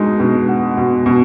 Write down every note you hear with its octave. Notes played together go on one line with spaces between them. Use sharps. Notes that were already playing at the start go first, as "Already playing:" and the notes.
Already playing: B2 G#3 D#4
B2
F#4
B2
B2